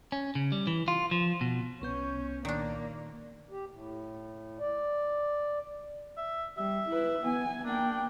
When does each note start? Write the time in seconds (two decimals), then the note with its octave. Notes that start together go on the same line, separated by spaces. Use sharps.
0.12 C#4
0.35 C#3
0.52 G3
0.67 E3
0.88 F4
1.11 F3
1.41 B2
1.82 C2 B3 C#4 C#6 G6
2.45 A#2 D#3 A#3 D4 D5
3.51 G4
3.70 A2
4.60 D5
6.17 E5
6.57 G3 E5
6.88 E4 B4
7.22 B3 G#5
7.65 A#3 D4 G5